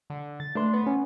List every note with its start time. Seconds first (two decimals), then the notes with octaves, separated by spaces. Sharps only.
0.10 D3
0.40 A6
0.55 A3 D4 B4 C6
0.73 B3
0.87 C#4